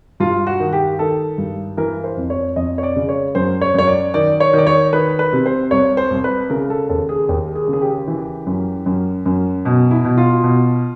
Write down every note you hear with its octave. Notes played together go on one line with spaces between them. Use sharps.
G2 F4
F#4
D#3
G4
D#3 A4
G2
E3 A#4
C5
F2
C#5
F2 D#5
C#5
D5
C#3
C#5
F#2 C5
C#5
F#2 C#5
D5
D#3 D5
C#5
D#3 D5
C#5
D#3 B4
B4
C3
C5
C2 C#5
C5
C2
B4
C#3 A#4
A4
D#2 A4
G#4
D#2 G4
G#4
C#3
G#4
G4
E3
F#2
F#2
F#2
B2
E4
B2
F4
B2